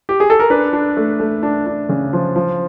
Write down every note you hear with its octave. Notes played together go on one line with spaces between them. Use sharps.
G4
G#4
A4
A#4
D4 B4
D4
A3
A3
D4
D4
C#3
F3
F3